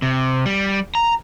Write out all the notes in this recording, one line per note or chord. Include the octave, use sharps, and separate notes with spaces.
C3
G3
A#5